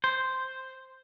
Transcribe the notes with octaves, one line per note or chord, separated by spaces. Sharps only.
C5